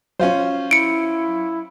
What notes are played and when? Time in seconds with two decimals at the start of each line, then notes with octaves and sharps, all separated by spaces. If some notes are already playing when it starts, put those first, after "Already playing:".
0.20 F#3 C#4 F4 C5
0.71 E4 C#7 D7